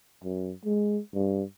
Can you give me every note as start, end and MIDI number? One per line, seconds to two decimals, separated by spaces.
0.24 0.53 42
0.65 1.00 56
1.14 1.43 43